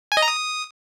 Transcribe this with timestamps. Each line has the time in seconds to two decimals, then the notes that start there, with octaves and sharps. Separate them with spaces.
0.12 G#5
0.17 D#5
0.22 A#5
0.28 D#6